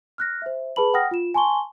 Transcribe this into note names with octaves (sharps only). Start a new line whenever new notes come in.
F6 F#6 A#6
C5 E5
G#4 B4 A5 B5 F#7
F#5 G5 D#6 F6 A#6
F4 E7
G#5 A5 C6 C#6 G7